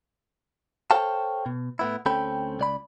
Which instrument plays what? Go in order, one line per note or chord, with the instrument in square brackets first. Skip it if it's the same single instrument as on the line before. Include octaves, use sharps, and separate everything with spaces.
[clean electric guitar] A4 C5 C#5 F5 G5 A5
B2
A2 B3 E4
D2 C4 C#4 A4 G5 B5
C#2 D5 B5